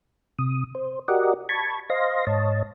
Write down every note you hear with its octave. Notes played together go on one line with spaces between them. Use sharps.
C3 D#6
C5
F#4 G4 A#4 D5 D#5 F#5
A5 B5 C#6 G#6
C5 D#5 F5 C6 A#6
G#2 C#5 D#5 A5